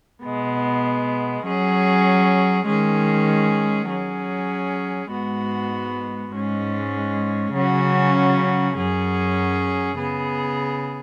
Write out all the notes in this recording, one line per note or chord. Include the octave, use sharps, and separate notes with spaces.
B2 G#3 B3
F#3 C#4 G#4
D#3 G#3 C#4 G#4
F#3 C#4 G#4
G#2 G#3 B3 F#4
G#2 G#3 C#4
C#3 F#3 C#4 F#4
F#2 F#3 C#4 G#4
C#3 B3 G#4